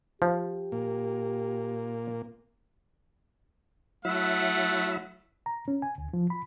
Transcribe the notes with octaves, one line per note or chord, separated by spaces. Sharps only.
F3 G4
A#2 A#3
F#3 A3 E4 E5 F#5
A#5
C#4
G#5
D2
F3
B5